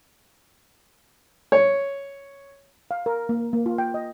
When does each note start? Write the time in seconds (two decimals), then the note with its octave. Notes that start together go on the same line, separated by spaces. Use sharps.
1.52 C#5
2.91 F5
3.06 A#4
3.29 A#3
3.53 A#3
3.66 F4
3.78 G5
3.94 D#5